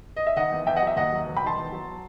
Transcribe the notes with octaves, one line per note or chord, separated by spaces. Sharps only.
D#5
E5
D#3 D#5 F#5
E2
E2 E5 G5
D#5 F#5
F#3
E5
D#2 D#5 F#5
F#3
E1
G5 B5
D#3
A5 C6
E2
F#3